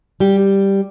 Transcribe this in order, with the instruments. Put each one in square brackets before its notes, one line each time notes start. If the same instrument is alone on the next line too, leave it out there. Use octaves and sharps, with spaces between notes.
[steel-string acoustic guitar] G3 G4